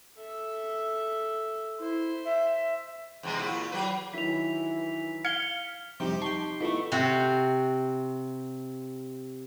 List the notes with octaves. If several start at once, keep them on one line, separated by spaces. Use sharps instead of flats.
A4 E5
E4 C5
E5
E2 C3 G#3
A#2 E4
F#3 B4
D#3 E3 F#3 E4 B6 F7
F5 F6 G#6 C#7 G7
F2 C3 G3 D#4 G4 G5
G5 A5 C6 C#6 C7
B2 A3 E4 F4 A4 B5 C#6
C3 C4 F#4